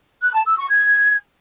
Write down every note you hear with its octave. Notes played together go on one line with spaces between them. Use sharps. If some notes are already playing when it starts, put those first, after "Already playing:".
F#6
A5
E6
C#6
G#6